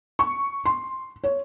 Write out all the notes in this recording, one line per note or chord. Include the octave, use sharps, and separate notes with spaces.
C#6
C6
C#5